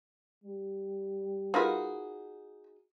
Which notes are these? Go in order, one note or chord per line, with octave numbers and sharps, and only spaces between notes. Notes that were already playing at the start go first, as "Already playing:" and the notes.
G3
D#4 F4 F#4 G#4 A#4 B4